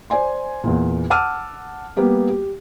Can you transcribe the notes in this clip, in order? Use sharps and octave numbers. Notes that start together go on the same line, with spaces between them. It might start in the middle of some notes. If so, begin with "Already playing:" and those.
C5 D5 G#5 C6
E2 A#2
F#5 A5 D6 E6 F6 D#7
G3 A#3 B3 G4
G4